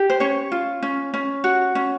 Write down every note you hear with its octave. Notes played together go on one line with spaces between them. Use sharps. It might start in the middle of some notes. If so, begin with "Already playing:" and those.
Already playing: G4
C5
C#4 C#5
F4
C#4
C#4
F#4
C#4